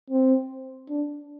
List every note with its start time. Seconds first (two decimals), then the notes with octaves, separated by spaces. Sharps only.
0.10 C4
0.89 D4